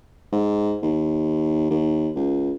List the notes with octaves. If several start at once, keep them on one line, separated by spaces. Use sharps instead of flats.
G#2
D#2
D#2
C#2